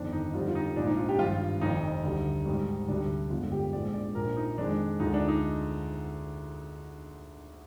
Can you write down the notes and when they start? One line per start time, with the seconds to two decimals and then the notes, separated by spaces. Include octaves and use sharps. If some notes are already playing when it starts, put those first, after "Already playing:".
Already playing: G1 F2 D#3 D4
0.13 D#4
0.34 F2 D3 G3 F4
0.48 F4
0.55 D#4
0.76 A#1 G#2 F3 D4
0.87 D#4
0.97 F4
1.09 G4
1.19 G#1 G2 F3 F4
1.61 F1 F2 D#3 D#4
2.04 D2 D3 G3
2.45 G#1 G#2 D#3 G3
2.88 D2 C3 G3 D4
3.30 G1 F2 D3 G#3 F4
3.52 G4
3.73 A#1 G#2 F3 G#3 D5
3.94 D5
4.15 A#1 A#2 F3 A#4
4.37 D#4
4.58 F2 D#3 G#3 D4
5.00 D2 D3 F3 G#3 D#4
5.14 D4
5.28 D#4